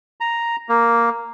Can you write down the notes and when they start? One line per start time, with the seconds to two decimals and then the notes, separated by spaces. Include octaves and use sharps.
0.20 A#5
0.69 A#3